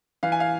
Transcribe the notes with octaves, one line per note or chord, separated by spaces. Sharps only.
E3 F5
G#5
F5